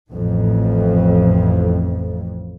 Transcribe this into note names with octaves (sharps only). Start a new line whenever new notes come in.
A1 F2 A2